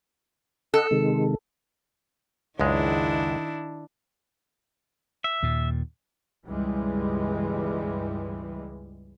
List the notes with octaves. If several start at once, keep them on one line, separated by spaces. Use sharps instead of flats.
A4 D#5 F#5
C3 D#3 G#3
C#2 F#2 D#3 G#3 D4 E4
E5
D#2 A#2
C#2 G2 B2 E3 G3 G#3